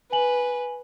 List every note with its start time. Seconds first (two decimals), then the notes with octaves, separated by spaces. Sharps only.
0.12 B4 G#5 F#7